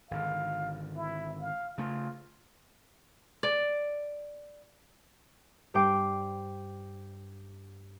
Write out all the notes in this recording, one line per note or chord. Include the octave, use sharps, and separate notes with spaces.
G#1 D3 F5
E4
F5
C#3 A3 F4
D5
G2 G4 C5 G5 D6